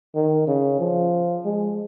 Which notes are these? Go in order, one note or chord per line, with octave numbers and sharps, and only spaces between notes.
D#3
C#3
F3
G#3